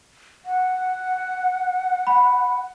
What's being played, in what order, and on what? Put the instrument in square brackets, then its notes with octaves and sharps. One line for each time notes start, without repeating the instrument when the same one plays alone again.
[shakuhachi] F#5
[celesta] B5